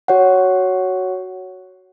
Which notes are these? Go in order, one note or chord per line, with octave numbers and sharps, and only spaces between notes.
F#4 C#5 F#5